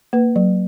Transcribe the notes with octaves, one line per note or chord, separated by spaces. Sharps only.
A#3 B4
F#3